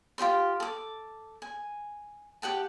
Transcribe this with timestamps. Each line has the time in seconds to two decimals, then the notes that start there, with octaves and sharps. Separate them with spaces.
0.18 F4 G4 C5 C6
0.60 A4 D6
1.42 G#5
2.42 G4 F#5 G5 A5